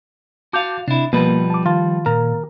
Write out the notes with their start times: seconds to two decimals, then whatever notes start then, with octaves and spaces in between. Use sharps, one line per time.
0.53 F#4 F5 A5 D6 G6
0.88 C3 D4 E4
1.13 B2 F3 G3 A#3 B4
1.50 A5 D6
1.66 D#3 F4 A5
2.06 A#2 A#4